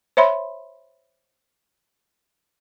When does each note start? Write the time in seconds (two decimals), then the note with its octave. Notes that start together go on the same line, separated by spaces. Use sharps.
0.17 C5 C#5 E5 B5 C6